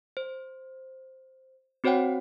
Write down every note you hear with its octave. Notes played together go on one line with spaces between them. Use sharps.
C5
C4 F#4 C5 C#5 F#5 G5